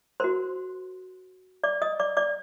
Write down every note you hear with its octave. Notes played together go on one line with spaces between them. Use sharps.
F#4 A#4 C5 C6
D5 D6
D#5 D#6
D5 D6
D5 D6